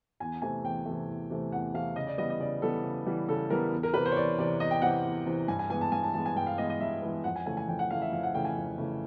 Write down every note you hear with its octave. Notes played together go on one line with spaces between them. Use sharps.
E2 G#5
C3 E3 A3 G#5
E2 G5
C3 E3 A3
E2
C3 E3 A3
E2 F#5
C3 E3 A3 F5
C#3 D#5
D5
E3 G3 B3 D#5
D#5
C#3 D5
E3 G3 B3 A4
C#3
E3 G3 B3
C#3 A4
E3 G3 B3 A#4
E2
A#4
C3 E3 B4
C5
C#5
E2 D5
C3 E3 D5
E2 D#5
G5
C3 E3 F#5
E2
C3 E3
G2 G#5
G#5
E3 G#3 B3 G#5
A5
G2 G#5
A5
E3 G#3 B3 A5
G#5
G2 G5
F5
E3 G#3 B3 D#5
D#5
G2 E5
E3 G#3 B3
F2 F#5
G#5
C#3 E3 A3 G#5
G#5
F2 G5
F#5
C#3 E3 A3 F5
E5
F2 F5
F#5
C#3 E3 A3 G5
G#5
F2
C#3 E3 A3